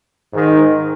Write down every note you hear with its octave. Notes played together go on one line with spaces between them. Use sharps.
G#2 D#3